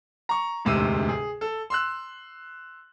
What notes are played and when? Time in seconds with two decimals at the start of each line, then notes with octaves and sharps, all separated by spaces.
0.29 A#5 C#6
0.65 E1 D2 G#2 C3 E6 D#7
1.09 G#4
1.41 A4
1.70 C6 E6 F#6